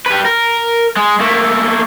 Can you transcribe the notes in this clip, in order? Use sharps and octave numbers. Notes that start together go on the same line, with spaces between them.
G4 B4
A#4
G#3
A3 A#3